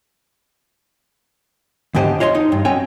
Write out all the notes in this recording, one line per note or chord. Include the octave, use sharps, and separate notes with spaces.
E2 G#2 D3 G4 C5 D#5
F4 C#5 D#5 G5 C6
D#4
G2
C4 C#4 F#4 C#5 G5 G#5